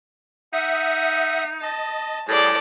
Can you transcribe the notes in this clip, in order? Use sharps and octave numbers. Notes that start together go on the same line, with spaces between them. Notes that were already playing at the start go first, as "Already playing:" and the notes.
D#4 E5 F#5 D#6
D#5 A5
A2 G3 G#4 A4 D5